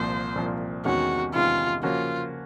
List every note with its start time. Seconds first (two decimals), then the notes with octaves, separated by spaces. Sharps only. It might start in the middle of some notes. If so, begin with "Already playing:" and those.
Already playing: C2 A#2 F3 C5
0.35 C2 A#2 F3
0.85 E2 C3 D#3 G#3 C#4 F#4
1.34 E2 C3 D#3 G#3 C#4 F4
1.83 C#3 F3 A#3 C#4 F4 F#4